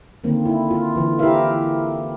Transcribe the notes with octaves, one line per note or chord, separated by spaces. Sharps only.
D3 D#3 A#3 C4
E4
F4
D3 E3
E4 G4 A#4 B4 E5 F5